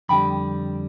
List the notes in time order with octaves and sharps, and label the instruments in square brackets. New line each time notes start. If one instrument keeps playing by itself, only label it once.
[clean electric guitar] F2 D3 G3 G5 B5